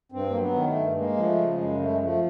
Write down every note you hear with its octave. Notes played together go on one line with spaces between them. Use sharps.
G2 C4
F#3 A#3
B3
D#3
A3
G2
G#3 A#3
F3
A3
C#3
G#3
F#2
G#3 A3
G#3
F3 A3